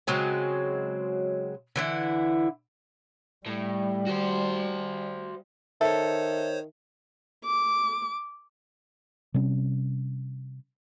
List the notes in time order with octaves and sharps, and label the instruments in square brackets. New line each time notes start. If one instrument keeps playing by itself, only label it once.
[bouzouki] C#3 F#3 G#3 C4
D3 E3 E4
[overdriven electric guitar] A2 [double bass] G3
[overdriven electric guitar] F#4 C5
[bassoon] D#3 [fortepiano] A4 [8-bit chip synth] C5 C#5 [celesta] E5
[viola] D6
[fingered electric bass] C3 G3 C#4